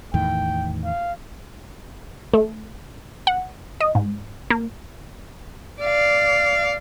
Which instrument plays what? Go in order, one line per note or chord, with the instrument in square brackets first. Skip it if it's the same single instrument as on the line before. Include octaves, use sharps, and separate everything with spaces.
[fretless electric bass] E2 A2 D#3 [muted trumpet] G5
[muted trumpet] F5
[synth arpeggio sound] A3
F#5
D#5
G#2
A#3
[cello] D5 F5